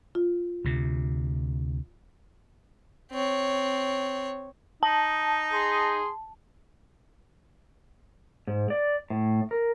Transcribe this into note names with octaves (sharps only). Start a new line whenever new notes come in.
F4
D2 C3
C4 C#5
D#4 A5
G#4 C6
G#2
D5
A2
A#4